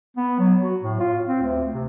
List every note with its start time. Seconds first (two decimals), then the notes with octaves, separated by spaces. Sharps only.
0.17 B3
0.39 F#3
0.62 F#4
0.82 A2
1.00 F4
1.27 C4
1.41 D2
1.74 C3